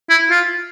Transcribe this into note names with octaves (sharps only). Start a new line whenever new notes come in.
E4
F4